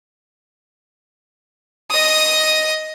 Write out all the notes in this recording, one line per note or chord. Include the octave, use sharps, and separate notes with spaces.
D#5 D#6